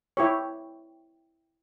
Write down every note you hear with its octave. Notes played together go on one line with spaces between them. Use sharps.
E4 G4 C#5